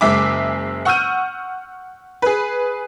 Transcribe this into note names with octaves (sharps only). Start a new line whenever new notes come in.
F#1 G#3 E5 D6
F#5 C#6 E6 F6 G6 D#7
G#4 B4